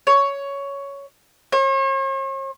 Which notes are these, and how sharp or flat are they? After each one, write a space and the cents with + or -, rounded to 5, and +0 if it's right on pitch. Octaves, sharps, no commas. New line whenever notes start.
C#5 +10
C#5 -45